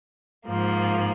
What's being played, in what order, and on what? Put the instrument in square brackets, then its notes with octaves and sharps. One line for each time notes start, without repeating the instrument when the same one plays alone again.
[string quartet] G#2 F3 A#3